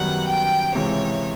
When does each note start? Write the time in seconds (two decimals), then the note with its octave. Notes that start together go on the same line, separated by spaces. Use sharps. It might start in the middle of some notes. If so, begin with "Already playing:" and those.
Already playing: F#2 D#3 G3 B3 F#5
0.28 G5
0.75 C#2 C3 E3 G#3 C#5